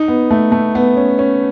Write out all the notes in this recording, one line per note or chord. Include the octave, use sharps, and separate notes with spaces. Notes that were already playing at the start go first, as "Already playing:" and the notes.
Already playing: D#4
B3
A3
A3
B3
C#4
C#4